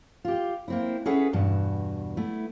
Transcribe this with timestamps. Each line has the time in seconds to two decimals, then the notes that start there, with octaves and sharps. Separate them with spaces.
0.25 F4 G4
0.68 A#3 C4 E4
1.06 C#4 G#4 A4 B4 E5 F#5
1.33 E2 G2 B2 A5
2.17 A3 B3 E4